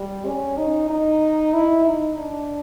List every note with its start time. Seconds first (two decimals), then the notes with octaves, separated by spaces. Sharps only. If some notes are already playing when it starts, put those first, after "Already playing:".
Already playing: G3
0.26 C#4
0.57 D#4
0.90 D#4
1.54 E4
1.86 D#4
2.18 D4